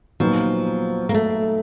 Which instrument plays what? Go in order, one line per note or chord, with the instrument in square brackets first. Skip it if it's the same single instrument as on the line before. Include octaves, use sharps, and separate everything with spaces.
[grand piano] A#2 F#3 B3 D#4 [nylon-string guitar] F3
[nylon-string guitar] A#3
A3